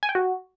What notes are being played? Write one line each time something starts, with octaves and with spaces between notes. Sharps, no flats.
G#5
G5
F#4